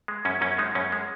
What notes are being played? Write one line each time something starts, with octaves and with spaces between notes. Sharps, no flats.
G#3
F#2 C#4
F#2 C#4
G#3 D#4
F#2 C#4
G#3